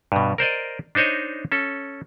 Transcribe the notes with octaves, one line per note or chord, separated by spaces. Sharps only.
G2 B2
A#4 C5 D5 D#5
D4 D#4 C5 C#5 D#5
C#4 A4